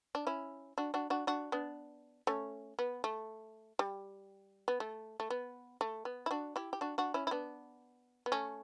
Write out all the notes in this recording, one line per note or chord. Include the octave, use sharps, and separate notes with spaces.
D4
C#4 E4
D4 F#4
D4 F#4
D4 F#4
D4 F#4
B3 D4
A3 C#4
B3
A3
G3
B3
A3
A3
B3
A3
B3
E4
D4 F#4
E4 G4
G4
D4 F#4
D4 F#4
C#4 E4
E4
B3 D4
B3
A3 C#4